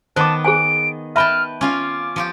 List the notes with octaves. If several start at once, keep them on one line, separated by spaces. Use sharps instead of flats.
D#3 B3 C5 A5 D6
G#4 C5 G#5 D7
B4 E5 G5 A5 B5 F6
C#4 F4 F5 D6
F3 F4 G4